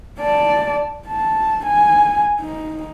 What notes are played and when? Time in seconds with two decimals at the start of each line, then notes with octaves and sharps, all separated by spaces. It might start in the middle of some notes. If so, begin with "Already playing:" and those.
0.20 D5 A5
1.07 A5
1.66 G#5
2.41 D#4